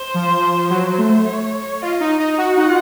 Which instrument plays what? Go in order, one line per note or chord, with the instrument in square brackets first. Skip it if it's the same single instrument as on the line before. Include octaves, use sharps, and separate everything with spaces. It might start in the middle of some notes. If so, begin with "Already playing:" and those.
Already playing: [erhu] C5
[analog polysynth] F3
F#3
A3
[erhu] C#5
[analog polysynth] F4 [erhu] D#5
[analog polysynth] D#4
D#4
[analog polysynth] F#4 [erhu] F#5
[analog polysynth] D#4
F4